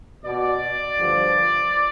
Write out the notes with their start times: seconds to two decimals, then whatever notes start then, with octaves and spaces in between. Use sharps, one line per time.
0.24 B2 D5
0.97 G2 D3 F3